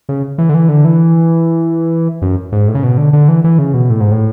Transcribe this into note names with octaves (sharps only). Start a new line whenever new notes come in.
C#3
E3
D3
E3
D3
E3
F#2
G#2
A2
C#3
B2
D3
D3
E3
E3
C#3
B2
A2
G#2
A2